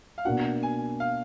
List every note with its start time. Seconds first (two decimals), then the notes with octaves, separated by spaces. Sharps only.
0.18 F5
0.25 B2 A#3 D4 F#4 F#5
0.63 G#5
1.00 F5